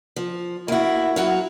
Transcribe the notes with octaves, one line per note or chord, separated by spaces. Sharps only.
F3
A#3 E4 F#4
F#3 F#4 F5